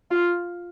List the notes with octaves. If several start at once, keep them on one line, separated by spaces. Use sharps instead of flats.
F4